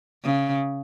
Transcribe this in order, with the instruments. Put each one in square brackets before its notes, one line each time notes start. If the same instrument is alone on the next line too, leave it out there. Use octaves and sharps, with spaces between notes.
[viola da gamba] C#3